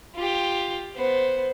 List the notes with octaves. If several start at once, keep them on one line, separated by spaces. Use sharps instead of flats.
F4 G4
B3 C5